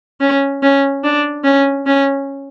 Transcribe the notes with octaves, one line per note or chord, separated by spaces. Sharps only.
C#4
C#4
D4
C#4
C#4